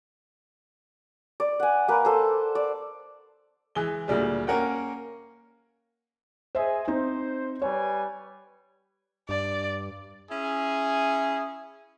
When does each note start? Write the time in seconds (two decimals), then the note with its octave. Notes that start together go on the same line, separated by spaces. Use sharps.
1.40 D5
1.60 F#5 G#5
1.88 A#3 B4
2.05 A4 C5
2.55 D5
3.75 E3 G#3 G7
4.08 D2 A#2 G3 G#3
4.47 A#3 C#4 A#4 F#5 G5
6.55 G#4 C5 D#5 E5 G#5
6.87 C4 D#4 C5
7.62 G3 B4 C#5 G#5
9.29 G2 D5
10.31 C#4 E4 G#4